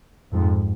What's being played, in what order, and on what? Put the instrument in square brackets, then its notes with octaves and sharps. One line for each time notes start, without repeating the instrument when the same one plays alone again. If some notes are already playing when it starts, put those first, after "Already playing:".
[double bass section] F2 G#2